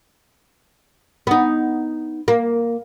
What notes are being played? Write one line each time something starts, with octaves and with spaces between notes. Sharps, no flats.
B3 D#4
A#3